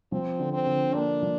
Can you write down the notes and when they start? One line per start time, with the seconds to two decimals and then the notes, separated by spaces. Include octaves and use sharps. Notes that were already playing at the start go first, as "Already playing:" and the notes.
0.12 F3 C4
0.39 D3
0.53 C4
0.67 D3
0.94 A#3 D4
1.23 F3